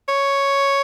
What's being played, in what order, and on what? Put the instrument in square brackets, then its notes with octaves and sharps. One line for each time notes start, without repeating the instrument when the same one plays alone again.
[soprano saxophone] C#5